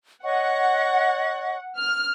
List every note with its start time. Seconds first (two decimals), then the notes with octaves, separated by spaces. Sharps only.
0.24 C#5 D#5 F#5 C#6
1.79 F6